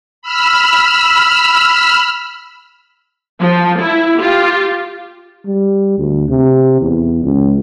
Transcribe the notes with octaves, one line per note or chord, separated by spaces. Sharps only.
B5 E6 F6
F3
E4
F4 G4
G3
D2
C3
E2
C#2